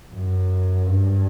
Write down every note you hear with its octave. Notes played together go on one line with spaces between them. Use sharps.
F#2
G2